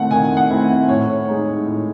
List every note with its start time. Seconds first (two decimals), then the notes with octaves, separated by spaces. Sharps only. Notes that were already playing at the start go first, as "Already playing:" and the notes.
Already playing: D#3 A3 C4 E4 F#5
0.11 D#3 G#5
0.37 F#5
0.50 A3 C4 E4
0.89 A2 C#5
1.28 G#3 D#4
1.66 A2